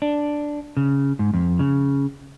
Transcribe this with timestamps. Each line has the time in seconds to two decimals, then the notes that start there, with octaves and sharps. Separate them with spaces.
0.02 D4
0.77 C#3
1.19 G#2
1.34 F2
1.59 C#3